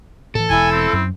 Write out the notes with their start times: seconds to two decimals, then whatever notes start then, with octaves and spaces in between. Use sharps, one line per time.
0.35 A2 E3 A4
0.50 E1 E4 G#5
0.72 C4
0.93 F#2